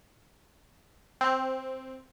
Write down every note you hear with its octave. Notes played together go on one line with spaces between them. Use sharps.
C4